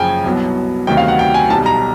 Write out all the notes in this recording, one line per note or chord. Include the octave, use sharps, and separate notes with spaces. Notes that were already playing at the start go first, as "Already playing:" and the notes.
Already playing: F#1 F#2 C#3 F3 G5 G#5
C2 B2 F#3 B3
D2 C3 D#3 F#3 B3 G5
F5
F#5
G5
G#5
B1 B2 G3 A5
A#5